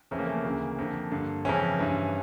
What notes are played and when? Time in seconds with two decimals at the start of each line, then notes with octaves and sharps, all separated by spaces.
0.11 F2 C#3 E3 C#4
0.19 A#3
0.27 A3
0.35 A#3
0.44 D2 C#3 E3
0.78 F2 D3
1.11 G2 D3
1.45 F2 C#3 E3 C#4
1.79 G2 E3